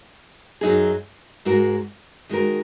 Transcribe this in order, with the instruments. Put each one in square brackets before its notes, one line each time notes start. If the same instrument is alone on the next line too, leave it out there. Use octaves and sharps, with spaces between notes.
[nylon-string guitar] F#2 F#3 D#4 G#4
G#2 G#3 F#4 A#4
D#3 G#3 F#4 A#4